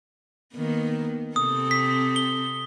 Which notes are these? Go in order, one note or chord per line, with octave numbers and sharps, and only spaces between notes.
D#3 A#3 B3
C3 C4 A4 D#6
B6
G7